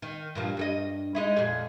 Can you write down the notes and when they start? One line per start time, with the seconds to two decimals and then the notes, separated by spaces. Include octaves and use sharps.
0.02 D#3
0.35 G2 A#2 F3
0.57 G2 A4 D#5
1.15 G#3 D#4 E4
1.36 F2 A#2 G#4